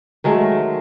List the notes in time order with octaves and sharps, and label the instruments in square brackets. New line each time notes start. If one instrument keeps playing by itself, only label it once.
[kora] D#3 F#3 G#3 A3